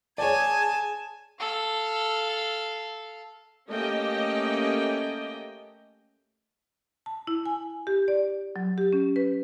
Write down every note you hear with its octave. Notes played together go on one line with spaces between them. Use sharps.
G#4 C#5 D5 G#5 A5 G#6
A4 F5
A3 A#3 C#4 G4 D#5 G5
A5
E4
G#5
G4
D5
F#3
G4
C#4
B4